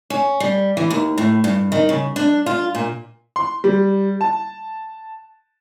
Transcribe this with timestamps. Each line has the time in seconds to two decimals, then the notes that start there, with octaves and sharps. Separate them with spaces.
0.10 C#4
0.40 G3
0.77 E3
0.90 D#2
1.18 A2
1.44 G2
1.72 D#3
1.89 C#3
2.16 D4
2.46 F4
2.75 A#2
3.36 C6
3.64 G3
4.21 A5